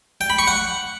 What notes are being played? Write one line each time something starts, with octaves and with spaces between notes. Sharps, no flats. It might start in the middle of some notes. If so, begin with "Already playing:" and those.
G5
B5
C#6
F#5